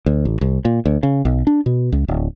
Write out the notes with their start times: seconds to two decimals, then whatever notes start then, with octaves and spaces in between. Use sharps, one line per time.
0.06 D2
0.25 A1
0.41 C2
0.65 A#2
0.86 D2
1.03 C#3
1.25 B1
1.47 D4
1.66 B2
1.92 C#2
2.08 D1